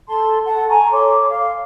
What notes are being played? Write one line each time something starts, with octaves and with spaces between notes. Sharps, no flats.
A4 A5 C6
A4 F#5 A5
G#5 A#5 C#6
A4 C#5 C6 D6
F5